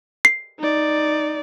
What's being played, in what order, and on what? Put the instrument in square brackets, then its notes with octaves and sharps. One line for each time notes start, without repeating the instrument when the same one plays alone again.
[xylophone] C7
[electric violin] D#4 D5